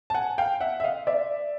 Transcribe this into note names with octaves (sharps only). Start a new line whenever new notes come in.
A5
F#5 G#5
F5 G5
E5 F#5
E5
D#5 F5
D5 E5